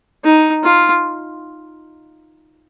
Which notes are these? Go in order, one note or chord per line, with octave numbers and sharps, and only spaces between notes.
D#4
F4